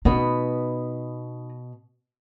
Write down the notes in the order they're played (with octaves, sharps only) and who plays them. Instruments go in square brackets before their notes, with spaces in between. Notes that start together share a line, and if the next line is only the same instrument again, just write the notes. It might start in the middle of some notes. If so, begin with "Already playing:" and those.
[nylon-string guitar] B2 B3 B4 [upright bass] D#4